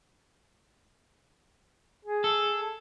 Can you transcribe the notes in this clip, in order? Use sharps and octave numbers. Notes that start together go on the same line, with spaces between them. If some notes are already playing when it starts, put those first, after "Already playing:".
G#4
A4